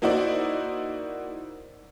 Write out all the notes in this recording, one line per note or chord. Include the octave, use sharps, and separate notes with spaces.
A#3 D#4 E4 F#4 C5 D5